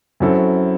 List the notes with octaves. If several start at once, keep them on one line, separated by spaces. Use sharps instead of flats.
F#2 F#3 C4 E4 A4